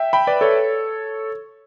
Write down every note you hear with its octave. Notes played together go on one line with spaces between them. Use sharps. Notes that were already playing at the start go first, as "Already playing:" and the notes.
Already playing: E5 G5
G5 B5
B4 D5
A4 C#5